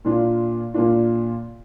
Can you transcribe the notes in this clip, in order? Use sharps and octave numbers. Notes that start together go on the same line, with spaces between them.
A#2 A#3 D4 F4
A#2 A#3 D4 F4